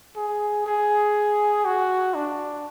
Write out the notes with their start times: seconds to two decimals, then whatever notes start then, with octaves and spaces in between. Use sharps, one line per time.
0.16 G#4
0.67 G#4
1.65 F#4
2.15 D4